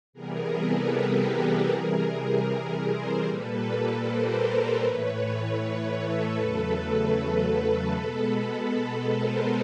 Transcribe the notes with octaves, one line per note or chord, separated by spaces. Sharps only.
C3 E3 G3 B3 G#4 A#4
A4 B4
G4 A4
G#4 A#4
C3 E3 G3 G#4 A#4
A#4 C5
A#2 G3 A#3 A4 B4
A#4 C5
A2 E3 A3 B4 C#5
B4 C#5
A4 B4
E2 C#3 F#3 A3
B2 G#3 B3 A4 B4
A4 B4
A4 B4
A#4 C5